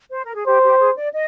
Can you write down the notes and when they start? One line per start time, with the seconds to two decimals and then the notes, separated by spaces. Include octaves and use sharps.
0.11 C5
0.24 A#4
0.35 G#4
0.47 G4 C5
0.63 G4
0.79 G#4
0.96 D5
1.13 D#5